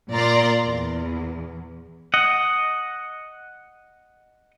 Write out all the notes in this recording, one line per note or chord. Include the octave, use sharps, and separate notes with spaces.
A#2 D5 A#5 C6
E2
D#5 F#5